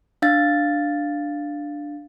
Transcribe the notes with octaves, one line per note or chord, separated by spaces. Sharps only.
D4 F5 A6